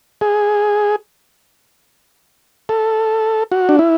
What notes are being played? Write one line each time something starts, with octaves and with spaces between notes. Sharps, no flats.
G#4
A4
F#4
D4
E4